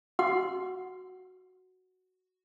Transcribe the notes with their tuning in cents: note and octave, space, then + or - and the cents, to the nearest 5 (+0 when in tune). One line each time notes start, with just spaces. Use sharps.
F#4 +0 F#5 +0 C6 +0